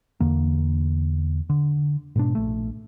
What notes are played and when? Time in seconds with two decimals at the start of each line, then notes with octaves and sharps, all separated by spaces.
0.20 E2 D3 A#3
1.50 D3
2.16 G#2 B2 D4
2.35 A#1 A3